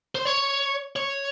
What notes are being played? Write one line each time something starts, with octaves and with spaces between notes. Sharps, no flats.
C5
C#5
C#5